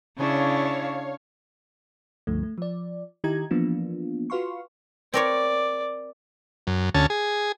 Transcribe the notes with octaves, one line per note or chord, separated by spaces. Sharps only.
C#3 D4 E4 C#5 F5
C#2 G2 D3 F3 A3
A3
F3 D5
D#3 E4 G4 D#5 A#5 G#6
E3 F3 A#3 B3 D4 F4
F4 F#4 B4 F5 C6 C#6
C4 A#4 C#5 D5
F#2
D2 C#4 A5
G#4